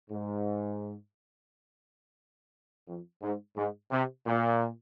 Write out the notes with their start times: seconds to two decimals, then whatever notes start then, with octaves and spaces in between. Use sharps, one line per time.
0.11 G#2
2.88 F2
3.22 G#2
3.57 G#2
3.91 C3
4.26 A#2